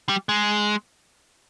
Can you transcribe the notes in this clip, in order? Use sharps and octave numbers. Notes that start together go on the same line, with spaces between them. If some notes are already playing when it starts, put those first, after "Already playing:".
G3
G#3